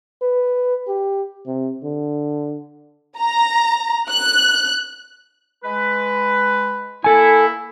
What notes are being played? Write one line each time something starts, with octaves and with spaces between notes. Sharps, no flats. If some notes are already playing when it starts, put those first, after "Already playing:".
B4
G4
C3
D3
A#5
F#6
G#3 B4
A#3 E4 A4 G#5